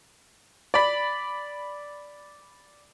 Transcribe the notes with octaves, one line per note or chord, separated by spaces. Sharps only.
D5 B5